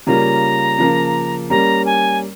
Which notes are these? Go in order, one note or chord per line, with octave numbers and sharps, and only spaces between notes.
C#3 G3 A#3 C#4 F4 A#5
C#3 F3 A#3
G3 A#3 C#4 A#5
G#5